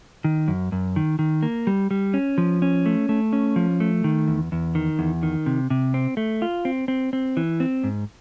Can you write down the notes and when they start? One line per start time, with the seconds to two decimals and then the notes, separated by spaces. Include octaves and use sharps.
0.24 D#3
0.48 F#2
0.72 F#2
0.96 D#3
1.19 D#3
1.43 A#3
1.67 G3
1.91 G3
2.14 C#4
2.38 F3
2.62 C#4
2.86 A3
3.09 A3
3.33 C#4
3.56 F3
3.80 A3
4.04 D#3
4.28 E2
4.52 E2
4.75 D#3
4.99 E2
5.23 D#3
5.46 C3
5.70 C3
5.94 C4
6.17 A3
6.42 F4
6.65 C4
6.88 C4
7.13 C4
7.37 E3
7.60 C4
7.84 G#2